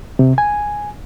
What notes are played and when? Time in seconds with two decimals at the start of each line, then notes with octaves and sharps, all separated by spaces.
0.19 C3
0.38 G#5